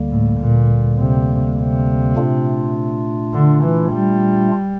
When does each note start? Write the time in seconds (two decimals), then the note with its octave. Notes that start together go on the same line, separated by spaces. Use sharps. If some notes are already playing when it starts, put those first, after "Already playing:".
Already playing: D2 D3 G3 A#3
0.11 A2
0.39 A#2
0.99 C3
1.58 C3
2.16 A#2 A3 D4 F4
3.33 D3
3.64 E3
3.92 G3